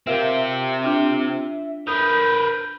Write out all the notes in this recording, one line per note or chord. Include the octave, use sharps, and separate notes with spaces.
C4 F4 G4 A#4 E5 F5
D4 F4
A#4 B4 D#6 G6